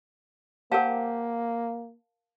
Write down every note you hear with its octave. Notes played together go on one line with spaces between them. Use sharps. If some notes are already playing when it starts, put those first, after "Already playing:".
A#3 G4 A#4 C5 F5 F#5 A5